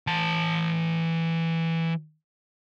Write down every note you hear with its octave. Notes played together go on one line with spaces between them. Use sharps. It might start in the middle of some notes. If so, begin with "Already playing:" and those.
E3 A5